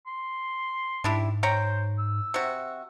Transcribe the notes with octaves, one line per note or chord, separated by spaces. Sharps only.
C6
G#2 D4 E4 G4
C5 C#5 G5 A#5
E6
C3 F#4